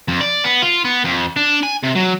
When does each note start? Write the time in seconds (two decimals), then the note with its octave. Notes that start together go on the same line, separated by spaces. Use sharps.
0.08 F2
0.21 D5
0.44 B3
0.62 F4
0.85 B3
1.05 F2
1.36 D4
1.63 G#5
1.83 C3
1.95 F#3